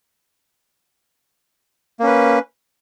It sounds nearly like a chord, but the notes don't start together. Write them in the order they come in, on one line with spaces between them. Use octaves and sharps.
A#3 C#4 B4